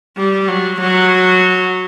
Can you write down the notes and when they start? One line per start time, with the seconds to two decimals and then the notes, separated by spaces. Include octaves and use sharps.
0.17 G3
0.48 F#3
0.80 F#3